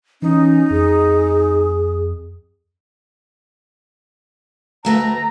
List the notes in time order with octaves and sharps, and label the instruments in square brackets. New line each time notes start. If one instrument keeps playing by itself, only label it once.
[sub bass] E3 [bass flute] C#4 [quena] D#4
[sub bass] F2 [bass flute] G#4
[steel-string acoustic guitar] D2 A3 B4 [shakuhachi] A#5